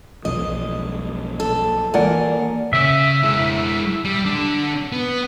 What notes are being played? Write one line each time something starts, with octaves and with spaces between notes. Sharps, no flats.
B1 E2 F3 D#5
A4
E3 A#3 A#4 D5 F#5 G#5
C#3 C#5 E5
G#3 E4
G3
D3 D4
B3